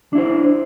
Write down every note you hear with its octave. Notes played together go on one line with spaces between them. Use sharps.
D4 E4 C5